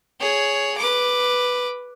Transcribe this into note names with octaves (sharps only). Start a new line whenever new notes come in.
G#4 C#5
B4 D6